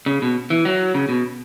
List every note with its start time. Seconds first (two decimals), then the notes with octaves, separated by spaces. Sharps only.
0.06 C#3
0.22 B2
0.50 E3
0.65 F#3
0.94 C#3
1.09 B2